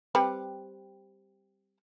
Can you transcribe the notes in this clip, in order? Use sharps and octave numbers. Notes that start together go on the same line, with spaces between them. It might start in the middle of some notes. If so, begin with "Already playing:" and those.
G3 C4 B4